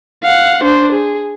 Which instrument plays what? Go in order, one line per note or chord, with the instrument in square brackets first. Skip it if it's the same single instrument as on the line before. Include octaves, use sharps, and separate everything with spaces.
[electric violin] F5 F#5
D4 C5
G#4